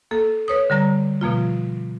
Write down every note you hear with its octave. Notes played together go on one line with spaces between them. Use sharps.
A#3 A4
B4 C#5 D#6
D3 G3 A#5
B2 F3 A#3 F4